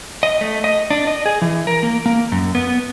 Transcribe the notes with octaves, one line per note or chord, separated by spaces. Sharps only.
D#5
A3
D#5
D4
D#5
G#4
E3
A#4
A#3
A#3
F#2
B3